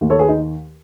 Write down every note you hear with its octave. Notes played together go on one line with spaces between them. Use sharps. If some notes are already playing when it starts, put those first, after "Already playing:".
D#2 D#3
A4 C#5
G#4 B4
D#4